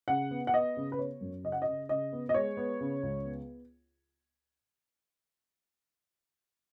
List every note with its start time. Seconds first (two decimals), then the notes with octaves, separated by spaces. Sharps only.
0.08 C#3 F#5
0.31 B3
0.47 F#5
0.54 B3 D#5
0.77 C#3
0.92 B4
0.99 B3 C#5
1.21 F#2
1.44 C#3 D#5
1.52 F#5
1.62 D#5
1.67 C#3
1.89 C#3 D#5
2.13 B3
2.29 D#5
2.34 G#3 C#5
2.57 B3
2.81 C#3
3.03 C#2
3.25 B3